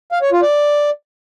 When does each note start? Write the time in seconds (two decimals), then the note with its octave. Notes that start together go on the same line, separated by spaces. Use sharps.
0.12 F5
0.22 C#5
0.32 F4
0.42 D5